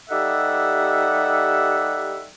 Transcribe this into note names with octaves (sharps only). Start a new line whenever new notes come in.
G3 D#4 G4 A4 E5 F#5